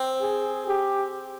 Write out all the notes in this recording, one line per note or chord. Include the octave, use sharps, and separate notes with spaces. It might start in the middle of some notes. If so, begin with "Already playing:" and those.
Already playing: C4
G#4
G4